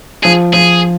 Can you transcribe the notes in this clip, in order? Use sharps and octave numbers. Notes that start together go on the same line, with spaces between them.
F3 G#4
F3 G#4